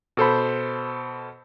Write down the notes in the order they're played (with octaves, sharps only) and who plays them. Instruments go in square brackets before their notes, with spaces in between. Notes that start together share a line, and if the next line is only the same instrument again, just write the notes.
[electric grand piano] B2 A4 C5 B5